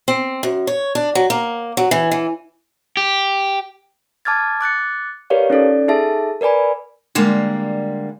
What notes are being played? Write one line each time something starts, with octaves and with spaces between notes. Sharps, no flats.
C4
F#2
C#5
D4
F#3
A#3
F#3
E3
E3
G4
A5 D6 F6 G#6 A6
D6 F#6 A6 C#7
G4 A#4 B4 C#5 D5 F5
C#4 D#4 A4 D5
D#4 G#4 A4 E5 A5
A#4 B4 D5 G#5 B5
D3 G3 G#3 A#3